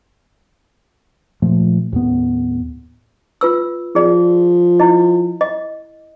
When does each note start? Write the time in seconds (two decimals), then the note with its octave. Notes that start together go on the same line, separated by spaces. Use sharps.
1.42 A#2 F3 A3
1.92 D#2 A2 B3
3.41 F4 B4 E6
3.95 F3 G#4 D5
4.80 E4 D#5
5.41 D#5